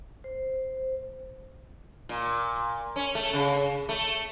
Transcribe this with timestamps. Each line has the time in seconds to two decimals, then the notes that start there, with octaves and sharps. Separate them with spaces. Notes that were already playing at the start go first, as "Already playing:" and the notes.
0.24 C5
2.09 A#2
2.96 C#4
3.15 A3
3.33 C#3
3.89 A3